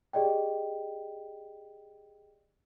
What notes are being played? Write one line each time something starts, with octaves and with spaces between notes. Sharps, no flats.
G4 G#4 D5 D#5 G5